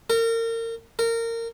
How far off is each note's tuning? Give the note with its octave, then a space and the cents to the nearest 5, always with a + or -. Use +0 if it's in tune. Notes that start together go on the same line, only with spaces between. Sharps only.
A#4 -30
A#4 -20